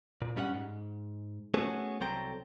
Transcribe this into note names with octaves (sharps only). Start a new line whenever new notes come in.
A#2
G2 G3 C#4 E5 F#5
G#2
A3 B3 C#4 F#4 G#4 A4
C2 F#3 C4 A4 G5 A#5